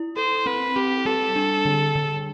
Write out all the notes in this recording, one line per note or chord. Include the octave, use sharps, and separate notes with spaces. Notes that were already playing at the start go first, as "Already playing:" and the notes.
Already playing: E4
A4 C5
C4 B4
C4 G4
G3 A4
D4
D3
D3